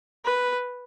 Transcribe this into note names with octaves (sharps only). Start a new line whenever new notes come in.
B4